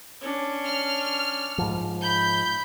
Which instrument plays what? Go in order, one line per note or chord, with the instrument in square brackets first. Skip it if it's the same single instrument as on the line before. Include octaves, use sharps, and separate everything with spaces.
[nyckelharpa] C#4 D4
[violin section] F6
[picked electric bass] G#2 F3
[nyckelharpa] B5 [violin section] G6